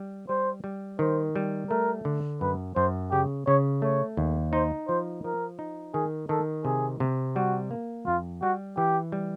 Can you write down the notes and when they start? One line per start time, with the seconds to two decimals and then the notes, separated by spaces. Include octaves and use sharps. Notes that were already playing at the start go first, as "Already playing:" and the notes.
Already playing: G3
0.29 G3 C5
0.64 G3
0.99 D#3 C5
1.36 G3
1.70 A3 A#4
2.05 D3
2.41 F#2 B4
2.76 F#2 C5
3.11 C#3 G4
3.46 C#3 C#5
3.82 A3 C#5
4.17 D#2
4.53 D#4 C5
4.88 F3 C5
5.24 F3 A#4
5.59 D#4
5.94 D#3 G#4
6.29 D#3 A4
6.65 C3 G#4
7.00 C3
7.36 G3 F#4
7.71 A#3
8.06 F2 F4
8.42 G3 F#4
8.77 E3 G4
9.12 G3